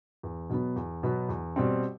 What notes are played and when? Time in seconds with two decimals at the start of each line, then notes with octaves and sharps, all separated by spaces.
0.23 E2
0.50 B2 F#3 B3
0.76 E2
1.03 B2 F#3 B3
1.29 E2
1.56 B2 G3 C4